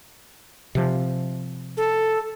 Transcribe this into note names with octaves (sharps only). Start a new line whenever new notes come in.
C3 F3
A4